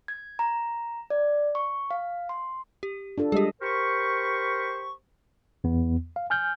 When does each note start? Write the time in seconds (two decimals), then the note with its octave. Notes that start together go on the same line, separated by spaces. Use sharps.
0.08 G#6
0.39 A#5
1.10 D5
1.55 C#6
1.91 F5
2.29 C6
2.83 G4
3.18 D4 F4 A4
3.32 G3 G#3 G4 G#4 D#5
3.62 G4 A#4 C5 B5 C#6
5.64 E2 B3
6.16 F5
6.30 G#5 F6 G6